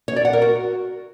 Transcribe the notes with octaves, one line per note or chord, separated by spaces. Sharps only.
C#5
D5
F#5
A#4
F#4